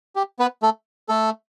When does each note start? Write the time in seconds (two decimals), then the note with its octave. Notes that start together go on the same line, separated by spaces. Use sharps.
0.16 G4
0.39 B3 B4
0.63 A3 A4
1.09 A3 A4